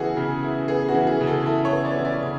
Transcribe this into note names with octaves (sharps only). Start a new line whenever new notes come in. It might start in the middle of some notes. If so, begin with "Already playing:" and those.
Already playing: C#3 E3 B3 F#4 G#4 A4
C#3
E4
B3 G#4
F#4
E3
G#4
C#3
A4
E4 A4
C#5
B3
D5
E3
D5
C#3